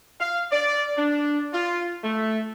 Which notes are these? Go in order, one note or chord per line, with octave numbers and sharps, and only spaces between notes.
F5
D5
D4
F4
A3